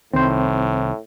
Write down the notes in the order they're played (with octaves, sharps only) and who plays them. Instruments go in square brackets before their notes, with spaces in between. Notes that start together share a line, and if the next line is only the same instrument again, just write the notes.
[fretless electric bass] C2 D#3 [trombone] A2 [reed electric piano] C4 C5